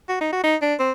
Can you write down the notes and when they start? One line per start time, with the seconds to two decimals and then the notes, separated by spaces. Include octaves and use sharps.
0.09 F#4
0.21 D#4
0.33 F#4
0.44 D#4
0.62 D4
0.79 C4